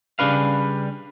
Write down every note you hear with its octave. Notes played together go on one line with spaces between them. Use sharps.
C#3 G3 D4 B4 F5